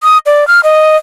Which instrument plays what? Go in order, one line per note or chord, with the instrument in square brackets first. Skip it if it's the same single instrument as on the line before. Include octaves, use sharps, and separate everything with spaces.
[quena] D#6
D5
F6
D#5